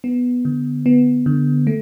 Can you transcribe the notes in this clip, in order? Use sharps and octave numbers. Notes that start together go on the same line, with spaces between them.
B3
D3
B3
D3
A3